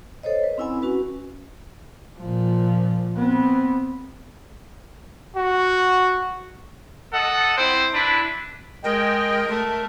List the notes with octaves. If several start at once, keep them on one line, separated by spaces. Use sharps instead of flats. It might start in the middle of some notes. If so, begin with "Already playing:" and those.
A4 C5 C#5 D#5
B4
C4 C#4 E4 F#5 G#5 B5
C#4 F#4 B4
A#2 F3
B3 C4
F#4
A4 D#5 F#5
C4 E4 C5
D4 E4 B4
G#3 A#4 D#5 G5
A3